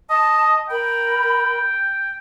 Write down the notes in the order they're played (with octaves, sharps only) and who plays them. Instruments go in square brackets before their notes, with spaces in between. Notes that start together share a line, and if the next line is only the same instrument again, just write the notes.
[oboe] D#5 [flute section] A5
[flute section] A#4 B5 [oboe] G5